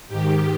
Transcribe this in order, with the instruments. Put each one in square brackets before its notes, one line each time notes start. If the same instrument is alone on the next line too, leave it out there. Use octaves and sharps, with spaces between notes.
[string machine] G#2 D#3 G4